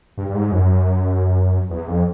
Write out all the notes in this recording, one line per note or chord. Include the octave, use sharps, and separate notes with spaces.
G2
G2
G#2
F#2
E2
F2